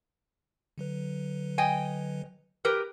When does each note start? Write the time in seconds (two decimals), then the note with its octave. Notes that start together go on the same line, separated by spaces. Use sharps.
0.78 D3 F#3 B4
1.58 D#5 G5 G#5
2.65 G4 A#4 B4